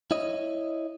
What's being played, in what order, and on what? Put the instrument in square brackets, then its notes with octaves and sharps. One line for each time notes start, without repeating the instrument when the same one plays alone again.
[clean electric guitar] E4 C#5 D#5